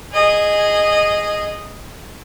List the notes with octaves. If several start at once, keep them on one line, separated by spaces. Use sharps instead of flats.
G#4 D#5